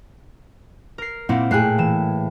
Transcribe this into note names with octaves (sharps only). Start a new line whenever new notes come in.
A#4 C7
A#2 A#3 C4 E4 F#5
A2 G#4 G5 F#6 C7
E3 E7